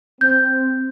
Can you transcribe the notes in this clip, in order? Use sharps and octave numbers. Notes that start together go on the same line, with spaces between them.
C4 G6